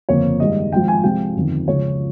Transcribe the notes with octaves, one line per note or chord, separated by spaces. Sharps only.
G1 F2 C#3 F3 A#3 C#5
G2 D#3 G#3 D#5
G#1 G#2 F3 G5
G#5
C2 C3 F3 G#3 G5
G1 F2 D#3
C#2 C#3 F3 G#3 C#5